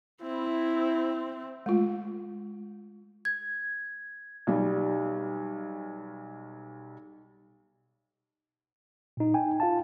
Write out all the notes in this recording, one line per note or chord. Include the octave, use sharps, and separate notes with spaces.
C4 E4
G#3 A3 F4
G#6
B1 G3
A#2 D#4
G5 G#5
F4 F5 A5